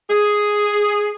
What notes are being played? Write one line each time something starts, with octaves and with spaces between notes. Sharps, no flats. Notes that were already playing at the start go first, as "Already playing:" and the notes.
G#4